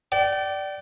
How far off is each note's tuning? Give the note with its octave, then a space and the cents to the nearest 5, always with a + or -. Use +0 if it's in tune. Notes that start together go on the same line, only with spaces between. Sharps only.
D5 +0 G5 -35